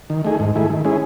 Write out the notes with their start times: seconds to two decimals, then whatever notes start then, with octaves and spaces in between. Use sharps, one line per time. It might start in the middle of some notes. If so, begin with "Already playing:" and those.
0.10 D#3
0.25 A3 D#4 G#4
0.40 G#2
0.55 D#3 A3 E4 G#4
0.70 D#3
0.85 G#3 C#4 E4 G#4